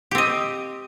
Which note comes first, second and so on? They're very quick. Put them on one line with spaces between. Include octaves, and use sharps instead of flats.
G4 C4 D#5